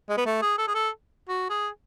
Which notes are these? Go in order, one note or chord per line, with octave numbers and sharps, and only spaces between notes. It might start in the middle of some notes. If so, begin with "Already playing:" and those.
G#3
B3
A3
G#4
A4
G#4
A4
F#4
G#4